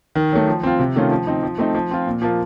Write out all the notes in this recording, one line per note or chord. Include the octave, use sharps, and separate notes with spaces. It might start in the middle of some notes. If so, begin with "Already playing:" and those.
D#3
F#3 A3
F3
C4 F4
C3
D#3 A3 C#4 F4
F3
C4 D#4
F3
A3 C4 D#4
F3
C4 F4
A#2
F3 A#3 F4